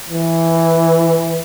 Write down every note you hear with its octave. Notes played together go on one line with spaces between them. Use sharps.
E3